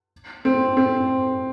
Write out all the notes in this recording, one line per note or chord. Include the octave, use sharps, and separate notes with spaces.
C4
C4